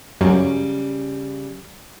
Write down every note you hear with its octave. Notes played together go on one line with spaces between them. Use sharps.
F#2 C#3 G3